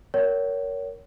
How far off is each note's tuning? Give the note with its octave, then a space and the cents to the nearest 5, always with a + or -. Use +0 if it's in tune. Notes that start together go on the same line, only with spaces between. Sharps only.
A#4 +0 C#5 +20 F#5 +45